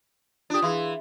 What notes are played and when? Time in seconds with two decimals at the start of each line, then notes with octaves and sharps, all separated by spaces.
0.50 D4 F4 G4 D#6
0.62 E3 G#4 F5 C6